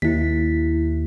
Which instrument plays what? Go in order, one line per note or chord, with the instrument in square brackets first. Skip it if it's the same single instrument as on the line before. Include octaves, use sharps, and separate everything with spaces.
[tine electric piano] D#2 [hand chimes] E4 B6